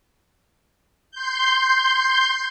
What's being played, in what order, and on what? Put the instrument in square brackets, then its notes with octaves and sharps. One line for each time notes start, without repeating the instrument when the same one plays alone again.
[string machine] C6 G6